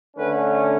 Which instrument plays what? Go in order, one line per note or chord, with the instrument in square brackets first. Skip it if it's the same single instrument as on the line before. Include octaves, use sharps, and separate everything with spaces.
[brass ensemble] D3 A3 C#4 B4